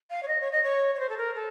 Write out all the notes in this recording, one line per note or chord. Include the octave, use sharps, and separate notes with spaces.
F5
C#5
D#5
C#5
D#5
C#5
C#5
C5
A4
A#4
A4